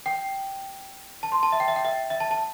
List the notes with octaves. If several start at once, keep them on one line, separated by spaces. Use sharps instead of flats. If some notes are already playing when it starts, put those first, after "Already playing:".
G5
A5
C6
A5
E5
G5
E5
G5
E5
E5
A5
A5